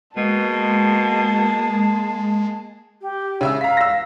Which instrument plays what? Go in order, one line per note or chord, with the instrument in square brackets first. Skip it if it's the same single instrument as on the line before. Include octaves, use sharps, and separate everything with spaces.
[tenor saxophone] B2 [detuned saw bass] G#3 [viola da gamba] A#3 G#4 [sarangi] A5
[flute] G4
[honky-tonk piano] C#3 E5 E6
[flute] F5 [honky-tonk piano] A#5 B6
[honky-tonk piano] E6 A#6